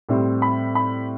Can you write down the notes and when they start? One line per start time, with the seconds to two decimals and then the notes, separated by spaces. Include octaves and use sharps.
0.09 A2 G3 C4
0.42 B5
0.75 B5